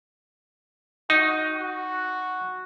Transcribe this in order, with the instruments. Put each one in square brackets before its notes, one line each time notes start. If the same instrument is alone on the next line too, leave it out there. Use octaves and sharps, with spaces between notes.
[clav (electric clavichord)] D#4 [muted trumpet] F#4
[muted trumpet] F#4